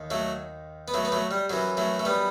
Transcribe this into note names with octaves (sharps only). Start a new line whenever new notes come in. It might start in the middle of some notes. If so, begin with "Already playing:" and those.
Already playing: D#2 D#3
F#3 A3
B3
F#3 A3
B3
F#3 A3
G3
F#2 E3 F#3
F#3 A3
A3
G3 B3